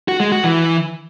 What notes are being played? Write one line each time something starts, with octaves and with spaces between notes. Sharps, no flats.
F#4
G#3
F#4
E3